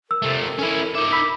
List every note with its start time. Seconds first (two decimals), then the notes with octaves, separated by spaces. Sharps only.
0.11 A#4 E6
0.22 C3 A3 A4
0.59 C#4 E4 A4
0.95 D#4 E5 D6
1.12 B5 E6 B6